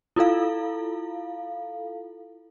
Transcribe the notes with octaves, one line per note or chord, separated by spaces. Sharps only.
E4 F4 A4 F5